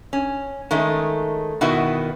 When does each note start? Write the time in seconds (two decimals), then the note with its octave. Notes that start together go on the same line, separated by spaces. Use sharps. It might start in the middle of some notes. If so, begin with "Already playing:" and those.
0.13 C#4
0.71 D#3 G#3 A3 C#4
1.61 B2 D#3 B3 E4 F#4